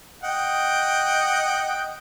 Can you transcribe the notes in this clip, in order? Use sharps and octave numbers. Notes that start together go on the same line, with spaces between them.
D#5 F#5 G5